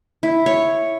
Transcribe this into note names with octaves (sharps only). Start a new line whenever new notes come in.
E4
C#5